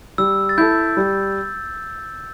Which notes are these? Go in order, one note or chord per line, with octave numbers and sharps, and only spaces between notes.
G3 E6
A6
E4 A4 G6
G3